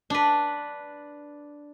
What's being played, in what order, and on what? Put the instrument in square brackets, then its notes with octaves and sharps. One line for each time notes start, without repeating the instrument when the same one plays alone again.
[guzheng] D4 B4